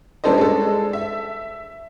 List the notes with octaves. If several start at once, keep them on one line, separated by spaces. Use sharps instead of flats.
G3 C#4 D4 A4 C5 D#5
G#3 A4
E5